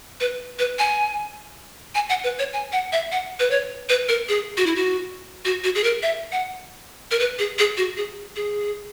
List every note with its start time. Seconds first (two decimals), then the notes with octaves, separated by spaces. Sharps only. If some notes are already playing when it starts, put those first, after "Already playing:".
0.20 B4
0.59 B4
0.79 G#5
1.95 G#5
2.10 F#5
2.24 B4
2.39 C#5
2.53 G#5
2.73 F#5
2.92 E5
3.12 F#5
3.40 B4
3.51 C#5
3.89 B4
4.09 A#4
4.29 G#4
4.57 F#4
4.66 E4
4.76 F#4
5.45 F#4
5.64 F#4
5.75 G#4
5.84 A#4
6.03 E5
6.32 F#5
7.11 A#4
7.20 B4
7.39 G#4
7.59 G#4
7.77 F#4
7.97 G#4
8.36 G#4